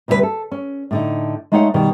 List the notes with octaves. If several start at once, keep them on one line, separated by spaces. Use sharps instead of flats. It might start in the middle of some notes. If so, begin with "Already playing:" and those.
D2 C3 G3 G#4 B4
A4
C#4
A2 D3 D#4
G#3 A3 D#4 C#5 F5 F#5
B2 D#3 G3